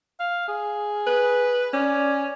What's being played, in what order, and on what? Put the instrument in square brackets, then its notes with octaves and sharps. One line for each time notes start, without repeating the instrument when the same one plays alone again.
[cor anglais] F5
G#4
[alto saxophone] B4
[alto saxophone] C#4 [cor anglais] D5